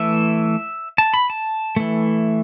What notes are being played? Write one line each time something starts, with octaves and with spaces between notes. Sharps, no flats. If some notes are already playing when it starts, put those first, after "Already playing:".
Already playing: E3 A3 E5
A5
B5
A5
E3 A3